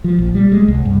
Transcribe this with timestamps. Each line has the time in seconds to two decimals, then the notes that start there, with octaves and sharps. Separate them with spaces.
0.04 F3
0.19 A#1
0.35 G3
0.52 G#3
0.68 C2
0.85 G2